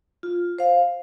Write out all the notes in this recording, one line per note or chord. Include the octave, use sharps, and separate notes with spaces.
F4
C5 F5